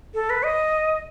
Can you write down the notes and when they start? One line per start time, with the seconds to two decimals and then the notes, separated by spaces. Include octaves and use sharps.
0.14 A4
0.30 B4
0.44 D#5